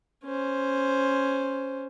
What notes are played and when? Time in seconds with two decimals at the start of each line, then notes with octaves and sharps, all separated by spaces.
0.25 C#4 C5